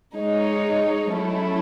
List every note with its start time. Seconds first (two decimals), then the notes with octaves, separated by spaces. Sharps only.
0.14 G#3 D#4 G#4 C#5
1.12 F#3 A3 C#4 E4